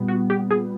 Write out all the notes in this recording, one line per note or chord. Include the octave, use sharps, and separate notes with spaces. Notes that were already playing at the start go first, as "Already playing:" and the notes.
Already playing: A#2 G3 B3
F#4
G4
G#4